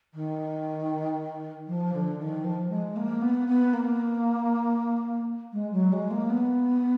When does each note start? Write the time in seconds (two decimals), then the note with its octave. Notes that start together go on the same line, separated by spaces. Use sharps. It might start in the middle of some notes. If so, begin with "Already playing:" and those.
0.14 D#3
1.67 F3
1.94 D3
2.19 D#3
2.44 F3
2.70 G#3
2.96 A#3
3.22 B3
3.48 B3
3.73 A#3
5.53 G#3
5.72 F#3
5.92 G#3
6.10 A#3
6.30 B3